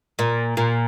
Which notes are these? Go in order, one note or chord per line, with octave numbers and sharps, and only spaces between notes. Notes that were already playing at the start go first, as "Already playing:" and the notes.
A#2
A#2